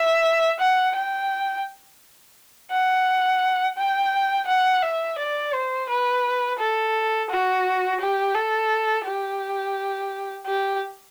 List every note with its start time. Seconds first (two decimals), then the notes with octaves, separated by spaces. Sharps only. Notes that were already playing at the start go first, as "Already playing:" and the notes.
Already playing: E5
0.60 F#5
0.96 G5
2.72 F#5
3.78 G5
4.47 F#5
4.83 E5
5.18 D5
5.54 C5
5.89 B4
6.59 A4
7.30 F#4
8.01 G4
8.35 A4
9.05 G4
10.46 G4